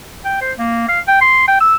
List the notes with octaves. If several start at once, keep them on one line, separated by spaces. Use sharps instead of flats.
G5
C5
A#3
F5
G5
C6
G5
E6